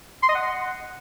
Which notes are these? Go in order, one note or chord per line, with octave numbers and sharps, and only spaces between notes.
C6
D#5
F#5